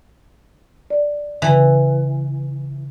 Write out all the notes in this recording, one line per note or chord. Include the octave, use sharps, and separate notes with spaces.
D5
C#3 E3